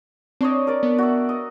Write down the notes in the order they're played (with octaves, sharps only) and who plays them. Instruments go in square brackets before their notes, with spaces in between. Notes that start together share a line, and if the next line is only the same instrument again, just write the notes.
[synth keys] C4 [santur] D4 C#5 D#5
[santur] A#4 D5
[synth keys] B3
[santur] F#4 E5
D#5